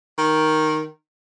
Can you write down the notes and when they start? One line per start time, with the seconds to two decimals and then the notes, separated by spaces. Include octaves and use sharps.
0.18 D#3